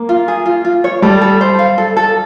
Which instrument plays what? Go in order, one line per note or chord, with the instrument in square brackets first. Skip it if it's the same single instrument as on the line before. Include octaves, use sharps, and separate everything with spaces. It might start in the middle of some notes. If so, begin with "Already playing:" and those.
Already playing: [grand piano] A#3
[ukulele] F4
G#4
F4
F4
C#5
[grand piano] G3 [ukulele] A4
[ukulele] A4
C5
F5
A4
A4